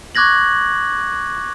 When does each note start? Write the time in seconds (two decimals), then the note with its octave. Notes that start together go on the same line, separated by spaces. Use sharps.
0.15 C#6 D6 F#6 G#6 A#6 F#7